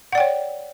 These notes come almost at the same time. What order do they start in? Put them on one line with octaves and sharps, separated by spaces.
F#5 D5 G5 C#5